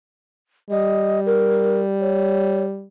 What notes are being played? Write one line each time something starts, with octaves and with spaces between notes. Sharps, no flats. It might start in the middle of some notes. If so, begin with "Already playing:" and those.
G3 D#5
A#4
C#5